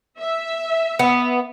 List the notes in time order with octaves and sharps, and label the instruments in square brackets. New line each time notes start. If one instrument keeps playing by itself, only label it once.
[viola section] E5
[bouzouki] B3